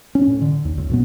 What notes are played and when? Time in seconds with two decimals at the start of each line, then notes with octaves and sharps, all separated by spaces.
0.15 C#4
0.27 A2
0.42 D3
0.65 D#2
0.78 C#2
0.89 F#2 B2 B3